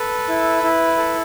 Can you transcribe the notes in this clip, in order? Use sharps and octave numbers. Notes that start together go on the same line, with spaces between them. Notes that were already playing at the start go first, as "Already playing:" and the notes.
Already playing: A4 B4
E4
E4
A4